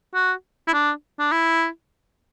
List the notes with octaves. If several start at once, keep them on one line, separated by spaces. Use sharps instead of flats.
F#4
E4
D4
D4
E4